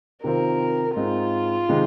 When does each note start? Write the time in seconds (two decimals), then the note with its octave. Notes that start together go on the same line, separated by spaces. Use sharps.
0.24 C3 D#3 C4 F4 A#4
0.96 G#2 G#3 C4 D#4 F4
1.69 C3 D#3 G#3 D#4